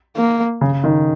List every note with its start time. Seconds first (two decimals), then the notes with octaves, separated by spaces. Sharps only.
0.16 A#3
0.61 C#3
0.84 D#3